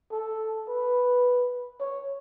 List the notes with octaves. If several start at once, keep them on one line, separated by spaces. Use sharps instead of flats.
A4
B4
C#5